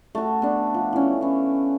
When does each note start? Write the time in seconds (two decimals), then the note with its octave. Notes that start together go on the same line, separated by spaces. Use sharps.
0.15 A3 F#4
0.42 B3 D4
0.74 F3
0.93 E3 C#4
1.21 E3 C#4